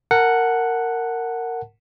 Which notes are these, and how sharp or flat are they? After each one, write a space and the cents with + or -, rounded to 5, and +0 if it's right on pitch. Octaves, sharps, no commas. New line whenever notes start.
A#4 -15 F#5 +0 A5 +0